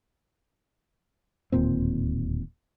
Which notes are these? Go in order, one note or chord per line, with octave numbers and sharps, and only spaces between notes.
D1 D#2 A#2 C4